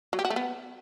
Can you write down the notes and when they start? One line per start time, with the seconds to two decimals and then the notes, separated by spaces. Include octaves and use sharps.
0.13 F#3
0.19 G4
0.25 F#4
0.30 A3
0.36 B3